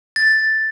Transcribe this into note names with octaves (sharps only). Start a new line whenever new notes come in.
A6